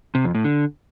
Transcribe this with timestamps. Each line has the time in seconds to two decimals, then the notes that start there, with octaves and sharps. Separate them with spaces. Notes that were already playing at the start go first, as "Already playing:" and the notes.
0.15 C3
0.25 F2
0.35 A2
0.44 D3